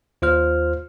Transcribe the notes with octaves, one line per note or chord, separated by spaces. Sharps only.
D#2 F4 C5 F6